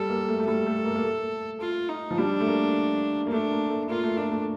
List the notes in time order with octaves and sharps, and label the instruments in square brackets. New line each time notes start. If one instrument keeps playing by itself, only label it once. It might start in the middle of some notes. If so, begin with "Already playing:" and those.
Already playing: [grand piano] G3 [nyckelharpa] A4
[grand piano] A#3
A3
A3
[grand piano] G3 [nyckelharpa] A4
[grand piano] A3
A#3
A#3
A3
[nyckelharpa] F4
D#4
[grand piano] F3
[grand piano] G3 [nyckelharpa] D4
[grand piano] A3
A#3
A#3
[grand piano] A3 [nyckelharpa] D4
[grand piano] A#3
A3
[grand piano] A#3 [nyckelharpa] F4
[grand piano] A3
[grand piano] A#3 [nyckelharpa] D4
[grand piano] A3